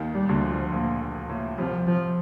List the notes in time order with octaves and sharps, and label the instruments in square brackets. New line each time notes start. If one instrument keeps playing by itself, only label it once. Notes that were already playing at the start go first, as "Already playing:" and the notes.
Already playing: [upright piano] D#2 D#3
[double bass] G3
[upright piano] D2 D3
[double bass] F3
[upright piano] A#1 A#2
A#1 A#2
A2
[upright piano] C2 C3 [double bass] F3
[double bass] F3